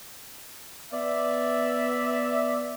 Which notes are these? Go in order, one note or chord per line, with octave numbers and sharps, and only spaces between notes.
B3 D5 E5